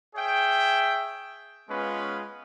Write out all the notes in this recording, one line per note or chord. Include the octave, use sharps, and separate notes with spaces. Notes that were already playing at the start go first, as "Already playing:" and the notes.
G#4 C#5 E5 G5
G#3 B3 C#4 F4 B4